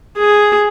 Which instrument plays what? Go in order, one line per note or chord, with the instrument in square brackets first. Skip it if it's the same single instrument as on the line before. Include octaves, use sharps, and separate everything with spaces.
[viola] G#4